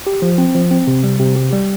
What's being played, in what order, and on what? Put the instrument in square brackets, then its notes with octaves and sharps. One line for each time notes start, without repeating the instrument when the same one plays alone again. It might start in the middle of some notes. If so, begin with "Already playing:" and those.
[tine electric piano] G4
F3
C4
F3
C4
C3
G3
C3
G4
G3